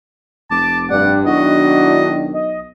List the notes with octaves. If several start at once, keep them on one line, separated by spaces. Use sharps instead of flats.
F1 A5 D6
G2 D5 F#5
B1 D#3 D4 E4 F#4 D#5
D#5